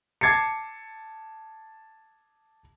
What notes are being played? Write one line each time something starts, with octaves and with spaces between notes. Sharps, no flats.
A5 D6 G#6 A6 C7 C#7